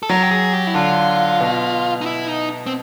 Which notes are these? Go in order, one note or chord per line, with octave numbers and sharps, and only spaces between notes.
A4
F#3 A#4
G4
G#4
G4
E4
D3 F4
B2
D#4
E4
D#4
C4